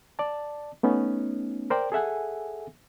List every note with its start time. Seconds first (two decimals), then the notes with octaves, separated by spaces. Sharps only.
0.19 D5 A5
0.83 A3 B3 C#4 D#4
1.70 A#4 C5 D5 G5
1.92 G#4 A4 E5 F#5 G#5